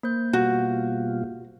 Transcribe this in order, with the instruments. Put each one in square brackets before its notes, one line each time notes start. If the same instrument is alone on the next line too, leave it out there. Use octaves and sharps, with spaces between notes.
[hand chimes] A#3 C5 G6
[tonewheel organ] B2 G3 F4 [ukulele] F#4